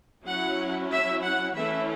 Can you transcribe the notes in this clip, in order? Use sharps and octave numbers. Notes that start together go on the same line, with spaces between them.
F#3 C#4 E4 F#5
E5
F#5
E3 A3 C#4 E4 E5